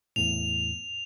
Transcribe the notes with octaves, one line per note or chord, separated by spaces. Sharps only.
E2 A2 F7